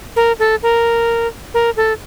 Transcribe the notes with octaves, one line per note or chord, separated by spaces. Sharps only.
A#4
A4
A#4
A#4
A4